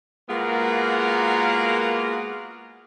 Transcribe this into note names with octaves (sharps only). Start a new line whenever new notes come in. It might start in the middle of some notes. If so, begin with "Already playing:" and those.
G#3 A#3 B3 F4 F#4 A#4